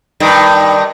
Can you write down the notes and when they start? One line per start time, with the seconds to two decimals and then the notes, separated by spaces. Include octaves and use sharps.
0.20 G2 D#3